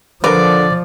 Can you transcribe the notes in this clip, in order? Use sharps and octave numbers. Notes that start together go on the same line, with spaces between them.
D3 F3 A#4 B4 D5